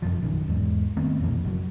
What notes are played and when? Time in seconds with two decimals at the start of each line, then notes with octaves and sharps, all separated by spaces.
0.02 F1 F#2 F3
0.22 A#1 F#2 D#3
0.48 E2 G#2
0.97 D#3 A3 B3 C4
1.19 B1 F2 A#2 E3
1.44 F#1 F#3